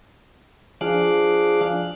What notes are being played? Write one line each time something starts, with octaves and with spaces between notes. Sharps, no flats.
F3 D4 G#4 F5 D6 F#6